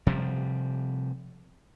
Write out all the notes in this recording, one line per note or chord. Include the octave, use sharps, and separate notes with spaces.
C3 F3 G3